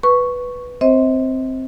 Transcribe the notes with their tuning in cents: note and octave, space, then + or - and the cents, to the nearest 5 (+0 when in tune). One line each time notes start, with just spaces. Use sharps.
B4 +0 C#6 +0
C4 +0 C5 +15 D#5 +45